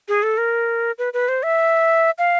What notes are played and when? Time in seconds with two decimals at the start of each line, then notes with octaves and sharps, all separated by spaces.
0.08 G#4
0.23 A4
0.38 A#4
0.98 B4
1.13 B4
1.28 C5
1.43 E5
2.18 F5